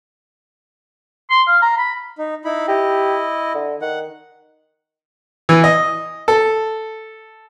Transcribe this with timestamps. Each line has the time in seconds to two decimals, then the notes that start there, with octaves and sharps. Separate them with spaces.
1.30 C6
1.48 F5
1.62 A#5
1.78 B5
2.18 D#4
2.45 D#4 E4 B5
2.68 E4 G4 D#5
3.54 D3
3.81 D#3 F#5
5.49 E3
5.64 D#5
6.28 A4